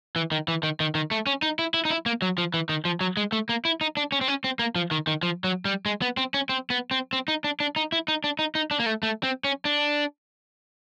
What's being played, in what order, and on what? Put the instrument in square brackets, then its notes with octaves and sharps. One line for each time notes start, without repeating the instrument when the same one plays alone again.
[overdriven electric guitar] E3
D#3
E3
D#3
D#3
D#3
A3
C#4
D#4
E4
E4
D#4
E4
A#3
F#3
F3
E3
D#3
F3
F#3
G#3
A3
A#3
E4
D#4
D4
C#4
C4
C#4
C4
A#3
F3
D#3
D#3
F3
F#3
G3
G#3
B3
C4
C#4
C4
B3
C4
C4
D#4
D4
D4
D#4
E4
D#4
D4
D#4
D#4
D4
A#3
A3
A3
C4
C#4
D4